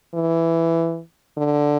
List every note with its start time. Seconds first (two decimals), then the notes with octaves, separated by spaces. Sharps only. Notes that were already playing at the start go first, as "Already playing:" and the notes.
0.14 E3
1.37 D3